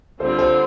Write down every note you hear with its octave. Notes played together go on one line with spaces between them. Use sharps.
D3 G3 C4 F4 A4 C5
A4 C5